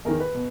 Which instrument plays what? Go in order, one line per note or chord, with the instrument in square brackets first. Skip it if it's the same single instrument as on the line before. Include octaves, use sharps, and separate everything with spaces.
[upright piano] E2 D#3 A#4
B4
B2